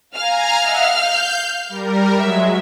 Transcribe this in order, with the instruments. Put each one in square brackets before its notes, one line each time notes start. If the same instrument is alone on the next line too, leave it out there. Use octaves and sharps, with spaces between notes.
[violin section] F5 F6 [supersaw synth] G#5 A#5
[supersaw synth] D#5 E5 F#5
G6
G3 A#4
[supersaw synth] F#3 G#3 [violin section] E5